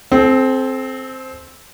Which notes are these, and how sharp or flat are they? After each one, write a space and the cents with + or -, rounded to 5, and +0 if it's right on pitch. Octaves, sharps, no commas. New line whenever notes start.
C4 +0 A4 -40